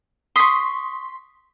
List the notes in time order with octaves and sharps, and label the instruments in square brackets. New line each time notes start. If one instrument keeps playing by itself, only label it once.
[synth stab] C6 B6 [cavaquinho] C#6 D#6